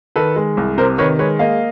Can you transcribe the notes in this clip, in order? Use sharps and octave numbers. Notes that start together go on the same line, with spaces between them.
D#3 A4 B4
G#3
C2
C3 A#4 C5
D#3 B4 C#5
G#3 B4 C#5
A#3 D#5 F5